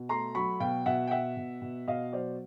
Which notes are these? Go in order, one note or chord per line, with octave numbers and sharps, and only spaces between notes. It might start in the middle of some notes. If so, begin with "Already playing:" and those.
Already playing: B2
A3 A#5 C6
F#3 B5 C#6
B2 F5 G5
B2 E5 F#5
G5
B2 E5 F#5
B2
B2
B2 D#5 F5
F#3 C5 D5